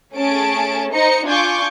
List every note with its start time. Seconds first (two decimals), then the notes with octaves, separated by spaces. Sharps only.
0.15 A3 C#4 G#4 A5 D7
0.93 D#4 C5 D#5 A#5 C#7
1.25 D4 F4 G#5 C#6 D6 G6